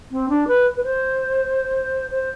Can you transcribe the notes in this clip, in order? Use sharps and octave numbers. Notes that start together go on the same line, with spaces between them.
C4
D4
B4
B4
C5
C5